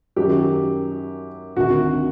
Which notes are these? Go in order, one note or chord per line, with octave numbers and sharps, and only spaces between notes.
F#2 D#3 F#3 G4
D2 C3 D#3 F#4